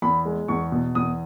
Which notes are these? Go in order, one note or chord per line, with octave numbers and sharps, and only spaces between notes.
E2 B5
G#3
E2 C#6
B2
E2 D#6